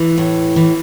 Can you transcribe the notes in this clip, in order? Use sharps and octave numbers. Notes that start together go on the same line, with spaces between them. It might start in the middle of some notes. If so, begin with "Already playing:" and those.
Already playing: E3
A2
E3